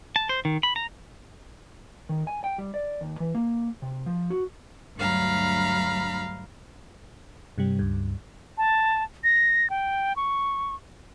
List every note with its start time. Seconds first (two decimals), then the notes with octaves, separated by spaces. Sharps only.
0.16 A5
0.29 C5
0.45 D#3
0.63 B5
0.76 A#5
2.09 D#3
2.27 G#5
2.44 G5
2.58 G3
2.74 D5
3.01 D#2
3.20 E3
3.35 A#3
3.82 C3
4.06 F3
4.30 F#4
4.96 D2 G2 F#3 F5 A#5 B5
7.58 G2 C3 G3
7.79 C#2 G2
8.58 A5
9.24 A#6
9.70 G5
10.16 C#6